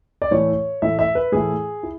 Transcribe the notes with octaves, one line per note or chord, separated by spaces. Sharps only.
D5
A2 E3 A3 E4 C#5
A2 E3 A3 E4 E5
E5
B4
A2 E3 A3 E4 G#4
E4